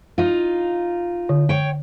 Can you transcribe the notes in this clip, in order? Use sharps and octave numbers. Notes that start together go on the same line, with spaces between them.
D#4 F4
D3
C#5 G5